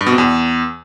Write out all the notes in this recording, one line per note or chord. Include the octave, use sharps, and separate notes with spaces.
G2
B2
C3
E2